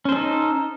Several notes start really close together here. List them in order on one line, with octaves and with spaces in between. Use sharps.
C#4 C5 A4 D#4